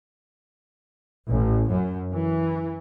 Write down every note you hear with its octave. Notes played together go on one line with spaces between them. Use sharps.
A1
F#2
E3